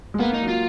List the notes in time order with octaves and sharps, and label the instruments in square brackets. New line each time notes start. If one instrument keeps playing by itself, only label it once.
[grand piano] G#3
[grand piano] A#3 [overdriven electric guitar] B3
[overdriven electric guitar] D#4
[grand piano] F#3
[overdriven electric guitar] F4